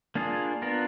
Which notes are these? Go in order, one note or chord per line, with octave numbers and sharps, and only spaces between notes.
A#3 D4 F4 G#4
B3 D4 F4 A#4